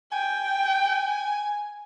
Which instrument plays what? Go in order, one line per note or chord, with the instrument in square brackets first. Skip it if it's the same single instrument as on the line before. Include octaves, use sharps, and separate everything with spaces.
[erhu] G5 [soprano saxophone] G#5